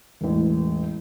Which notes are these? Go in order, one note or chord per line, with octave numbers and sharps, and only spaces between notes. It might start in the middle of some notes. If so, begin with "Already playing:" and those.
E1 A1